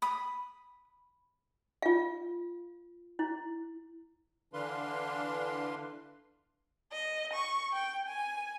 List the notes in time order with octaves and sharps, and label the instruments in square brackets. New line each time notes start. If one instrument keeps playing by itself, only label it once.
[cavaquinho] B5 D#6
[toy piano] F4 F5
E4
[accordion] D3 E3 D4 B4 F5 C6
[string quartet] D#5
C#6
G5
G#5